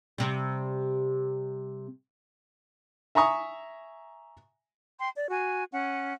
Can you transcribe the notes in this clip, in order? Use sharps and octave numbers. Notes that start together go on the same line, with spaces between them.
C3 G3
E5 G#5 A#5 C#6 D#6
G5 C6
D5
F#4 G#5
C#4 F#5